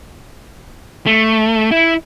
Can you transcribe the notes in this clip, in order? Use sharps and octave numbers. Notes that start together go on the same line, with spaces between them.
A3
E4